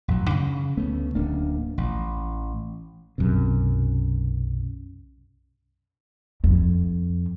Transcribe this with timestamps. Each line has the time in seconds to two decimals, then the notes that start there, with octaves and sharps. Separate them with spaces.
0.08 A1 F#2 F#3
0.30 C#3
0.77 D2 A3 B3 C#4
1.15 D1 A#3 D4
1.78 A1
3.18 B1 F#2 C3
6.44 F2